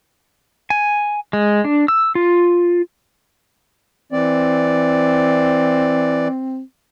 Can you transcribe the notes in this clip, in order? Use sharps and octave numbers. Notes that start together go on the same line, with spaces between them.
G#5
G#3
D4
E6
F4
E3 C4 D5